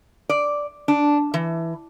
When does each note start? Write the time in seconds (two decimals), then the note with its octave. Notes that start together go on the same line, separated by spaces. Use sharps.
0.29 D5
0.88 D4
1.34 E3